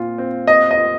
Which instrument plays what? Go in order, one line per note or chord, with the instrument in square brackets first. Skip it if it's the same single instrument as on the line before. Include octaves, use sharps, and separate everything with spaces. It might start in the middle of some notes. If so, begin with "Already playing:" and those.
Already playing: [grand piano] A#2 C4 F4
C4
[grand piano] C4 [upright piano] D#5
[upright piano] D#5
[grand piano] F4